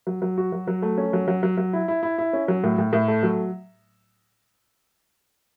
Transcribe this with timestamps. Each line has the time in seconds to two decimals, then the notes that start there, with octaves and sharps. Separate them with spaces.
0.07 F#3
0.22 F#3
0.38 F#4
0.52 F#3
0.68 F#3
0.82 A3
0.98 C#4
1.13 F#3
1.28 F#3
1.43 F#3
1.58 F#3
1.73 E4
1.88 E4
2.03 E4
2.18 E4
2.33 C#4
2.48 F#3
2.64 A2
2.78 A2
2.93 A2
3.08 A3
3.23 F#3